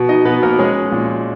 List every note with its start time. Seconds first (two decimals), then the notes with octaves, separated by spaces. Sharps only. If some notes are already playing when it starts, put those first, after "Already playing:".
Already playing: B2
0.09 D#4 D#5
0.25 B2 B3 B4
0.43 A#3 A#4
0.59 G#3 C#4 G#4
0.92 A#2